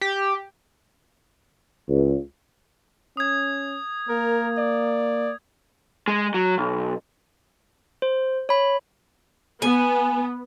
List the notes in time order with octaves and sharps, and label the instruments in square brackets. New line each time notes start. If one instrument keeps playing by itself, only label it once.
[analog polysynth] G4
[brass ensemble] C#2
[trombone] C#4 [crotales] D#6 G#6
[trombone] A#3 [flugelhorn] A#4
[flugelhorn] D5
[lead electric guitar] G#3
F#3
B1
[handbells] C5
C#5 B5
[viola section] B3 [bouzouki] G#5